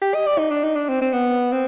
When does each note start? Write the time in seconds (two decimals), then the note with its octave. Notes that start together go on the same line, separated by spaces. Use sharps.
0.02 G4
0.14 D#5
0.27 D5
0.38 D#4
0.51 D4
0.64 D#4
0.76 D4
0.89 C4
1.02 C4
1.13 B3
1.52 C4